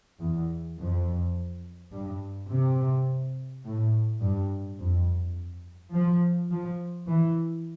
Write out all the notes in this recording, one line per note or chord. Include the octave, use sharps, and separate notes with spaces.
E2
F2
G2
C3
A2
G2
F2
F3
F3
E3